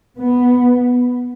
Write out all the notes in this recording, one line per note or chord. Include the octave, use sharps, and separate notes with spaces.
B3